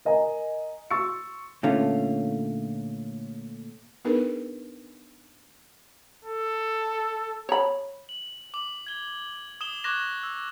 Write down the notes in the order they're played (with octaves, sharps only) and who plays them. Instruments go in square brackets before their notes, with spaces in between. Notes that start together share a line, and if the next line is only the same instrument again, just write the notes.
[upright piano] A#4 D#5 G#5 A#5
C6 C#6 E6 A6 C#7
[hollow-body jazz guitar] A#2 D3 A3 C#4 F4
[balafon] B3 D4 D#4 G#4 A#4 B4
[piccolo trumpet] A4
[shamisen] C#5 B5
[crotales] F#7
D6 F#7
G#6 G7
D#6 E7 G7
C#6 D6 F#6 G#6 A#6 E7
E6